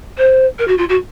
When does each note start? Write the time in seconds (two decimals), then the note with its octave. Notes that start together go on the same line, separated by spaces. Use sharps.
0.18 C5
0.59 A#4
0.68 F#4
0.78 F4
0.89 F#4